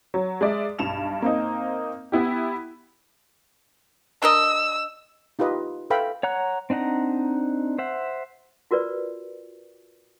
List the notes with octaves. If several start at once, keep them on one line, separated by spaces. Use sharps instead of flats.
F#3
G#3 D5 E5
B1 G2 E7 F7
A#3 C4 D#4
B3 E4 G4
D4 A#4 D#5 E6
D#4 F4 G4 B4 D#5
A4 B4 E5 F5 G5 B5
C#5 F#5 A#5 F#6
C4 D4 D#4 F#5 A#5
C5 E5 F#5
F4 F#4 A#4 B4 D5